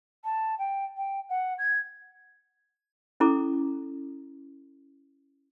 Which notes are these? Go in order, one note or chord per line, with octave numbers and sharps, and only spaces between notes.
A5
G5
G5
F#5
G#6
C#4 E4 A4 A#5 D6